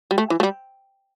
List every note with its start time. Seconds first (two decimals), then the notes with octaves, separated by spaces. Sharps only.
0.11 G3
0.18 A3
0.30 E3
0.40 A3
0.43 G3